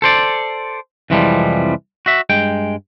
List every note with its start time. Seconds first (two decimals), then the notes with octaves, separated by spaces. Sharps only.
0.02 A4 C5 D5
1.10 C2 F2 E3 F3 G3 G#3
2.06 F#4 E5
2.30 G2 G#3 G5